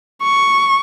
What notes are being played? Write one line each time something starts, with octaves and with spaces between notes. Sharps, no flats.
C#6